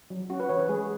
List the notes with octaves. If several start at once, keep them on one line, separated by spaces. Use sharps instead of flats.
F#3
C#4 F#4
B4
E3 C#5
B4
G#3 G#4